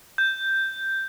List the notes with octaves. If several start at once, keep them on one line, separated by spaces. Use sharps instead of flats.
G6